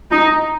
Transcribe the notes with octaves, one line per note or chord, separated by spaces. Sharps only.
D#4